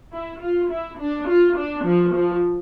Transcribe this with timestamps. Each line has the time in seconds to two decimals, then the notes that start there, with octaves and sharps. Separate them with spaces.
0.13 E4
0.41 F4
0.70 E4
0.99 D4
1.28 F4
1.56 D4
1.85 F3
2.13 F3